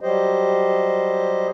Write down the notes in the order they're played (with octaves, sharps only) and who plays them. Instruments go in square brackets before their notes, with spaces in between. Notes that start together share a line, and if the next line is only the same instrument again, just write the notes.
[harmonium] F#3 G3 G4 C5 D#5